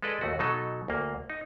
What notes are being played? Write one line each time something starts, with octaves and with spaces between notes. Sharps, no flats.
G#3 A4 B4 D5 D#5
D#2 A3 F#4
B2 F#3 D#4 A4
D2 A#3
D#4